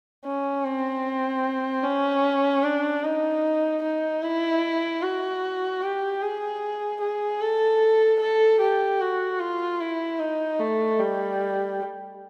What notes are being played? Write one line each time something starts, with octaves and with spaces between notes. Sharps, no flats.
C#4
C4
C#4
D4
D#4
D#4
E4
F#4
G4
G#4
G#4
A4
A4
G4
F#4
F4
E4
D#4
A3
G3